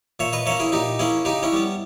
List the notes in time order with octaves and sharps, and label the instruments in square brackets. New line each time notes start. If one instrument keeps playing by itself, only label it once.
[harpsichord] A#2 C#5 E5
B4 D#5
A#3 C#4 C#5 E5
E4 G#4
A#2 D#4 G4
A#3 C#4 E4 G#4
C#3 D#4 G4
C#4 E4
G3 B3